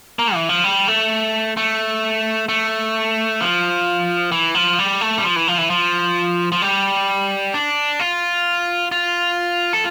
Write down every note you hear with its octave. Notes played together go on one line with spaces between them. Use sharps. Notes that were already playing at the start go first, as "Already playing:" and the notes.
A#3
E3
F3
G3
A3
A3
A3
F3
E3
F3
G3
A3
G3
F3
E3
F3
E3
F3
F3
G3
D4
F4
F4
A4